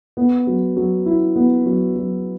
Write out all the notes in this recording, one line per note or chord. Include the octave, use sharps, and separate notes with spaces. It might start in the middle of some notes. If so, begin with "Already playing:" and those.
B3
F#3
F#3
E4
B3
F#3
F#3